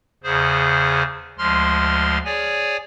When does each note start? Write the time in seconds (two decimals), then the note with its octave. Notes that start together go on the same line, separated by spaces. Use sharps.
0.24 E2 C#3 G#4 C5
1.38 D2 F3 G#3 C6 F6
2.25 G#4 C#5 D5 G#5